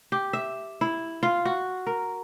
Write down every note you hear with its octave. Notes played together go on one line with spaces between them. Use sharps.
G4
E5
E4
F4
F#4
A#4